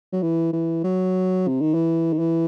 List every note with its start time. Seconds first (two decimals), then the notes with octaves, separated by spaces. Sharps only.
0.12 F#3
0.22 E3
0.53 E3
0.84 F#3
1.48 C3
1.61 D#3
1.74 E3
2.13 D#3
2.19 E3